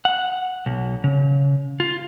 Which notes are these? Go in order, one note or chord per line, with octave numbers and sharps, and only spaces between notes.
F#5
B1
C#3
F4